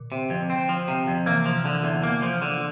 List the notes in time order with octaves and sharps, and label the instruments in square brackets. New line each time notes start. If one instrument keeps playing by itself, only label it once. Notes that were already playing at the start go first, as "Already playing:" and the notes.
Already playing: [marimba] A#2 D3
[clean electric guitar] C3
F2
C4
F3
C3
F2
[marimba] C3 E3 [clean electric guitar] A#3
[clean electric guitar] F3
D3
E2
A#3
F3
D3